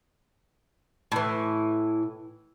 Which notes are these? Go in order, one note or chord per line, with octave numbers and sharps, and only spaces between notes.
A2 E3